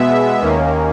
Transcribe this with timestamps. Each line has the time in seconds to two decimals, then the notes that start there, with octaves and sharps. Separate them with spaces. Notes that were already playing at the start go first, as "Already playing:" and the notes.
Already playing: B2 G#3 B3 E5
0.41 D#2 D#3 A#3 C#4